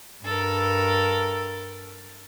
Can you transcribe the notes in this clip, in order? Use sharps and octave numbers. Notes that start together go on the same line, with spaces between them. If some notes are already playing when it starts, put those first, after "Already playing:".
G2 A4 A#4